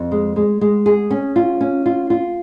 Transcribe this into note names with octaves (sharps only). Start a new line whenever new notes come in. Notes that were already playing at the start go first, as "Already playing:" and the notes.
Already playing: F2
G#3
G#3
G#3
G#4
C#4
F4
C#4
F4
F4